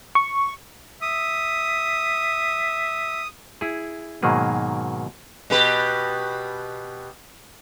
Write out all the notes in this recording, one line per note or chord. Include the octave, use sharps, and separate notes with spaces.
C#6
E5 D#6
E4 G#4
G#2 B2 D#3 F#3 A#3 G#4
B2 G4 B4